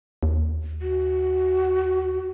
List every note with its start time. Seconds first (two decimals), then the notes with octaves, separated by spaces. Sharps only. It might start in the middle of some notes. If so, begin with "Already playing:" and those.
0.23 D#2
0.82 F#4